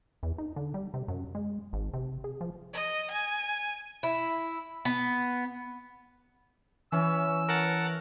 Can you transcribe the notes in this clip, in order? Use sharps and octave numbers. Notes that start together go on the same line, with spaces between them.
E2
D#4
D3
G3
C3
F#2
G#3
G#1
C3
G#4
F3
D#5
G#5
E4
B3
E3 C#4 E6
A#4 F#5 A5